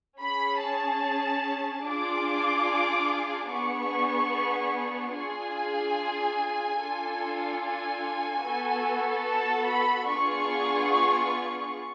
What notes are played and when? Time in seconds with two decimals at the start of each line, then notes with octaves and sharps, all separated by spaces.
0.19 C#4 G#4 B5
0.60 A5
1.84 D4 F4 G#4 D6
3.49 B3 D4 G#4 C#6
5.14 D4 F4 G#4 G#5
6.80 D4 F4 A4
7.62 G#5
8.44 B3 F#4 A4
9.27 A5
9.68 B5
10.09 B3 D4 F4 G#4 C#6